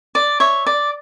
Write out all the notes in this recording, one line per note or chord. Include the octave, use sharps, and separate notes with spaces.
D5
C#5 E5
D5